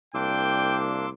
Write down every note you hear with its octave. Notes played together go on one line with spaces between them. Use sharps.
C2 A#3 D4 G5 C6 D6 E6